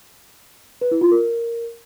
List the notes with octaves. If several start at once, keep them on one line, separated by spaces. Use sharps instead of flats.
B4
E4
F4
A#4